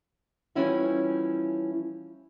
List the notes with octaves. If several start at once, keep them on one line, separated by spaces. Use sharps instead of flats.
E3 F3 G3 C#4 E4 F#4